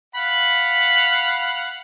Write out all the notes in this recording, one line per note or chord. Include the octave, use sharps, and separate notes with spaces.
F5 F#5 B5